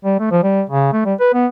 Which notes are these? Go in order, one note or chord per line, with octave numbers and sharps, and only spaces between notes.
G3
A3
F3
G3
C#3
A3
G3
B4
B3